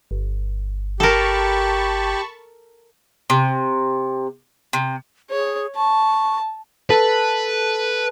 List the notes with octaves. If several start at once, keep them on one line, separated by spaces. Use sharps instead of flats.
G1
G4 A4 A#4 A5 B5 C#6
C3
C3
G#4 C#5
A5 C#6
A4 B4